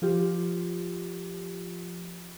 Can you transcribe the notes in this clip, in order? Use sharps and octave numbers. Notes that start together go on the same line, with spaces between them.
F3 F4 G4